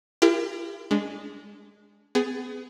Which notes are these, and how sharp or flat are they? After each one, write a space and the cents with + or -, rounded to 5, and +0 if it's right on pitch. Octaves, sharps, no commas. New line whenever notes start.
E4 +45 G4 +35 A#4 +0
G#3 -10 D4 -25
B3 +35 G#4 +0